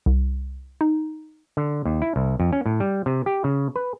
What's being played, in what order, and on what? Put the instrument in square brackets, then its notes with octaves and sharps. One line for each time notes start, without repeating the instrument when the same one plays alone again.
[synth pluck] C2
D#4
[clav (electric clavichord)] D3
D#2
E4
C2
F2
C#4
A2
G3
C3
G4
C#3
B4